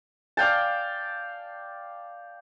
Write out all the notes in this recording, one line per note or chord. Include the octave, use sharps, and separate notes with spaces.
D5 F5 G5 A5